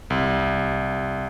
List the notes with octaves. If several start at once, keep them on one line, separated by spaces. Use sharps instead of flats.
C2